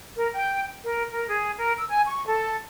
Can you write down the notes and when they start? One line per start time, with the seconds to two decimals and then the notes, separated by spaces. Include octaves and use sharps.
0.16 A#4
0.33 G5
0.85 A#4
1.12 A#4
1.28 G#4
1.58 A#4
1.76 E6
1.89 G#5
2.06 C#6
2.26 A4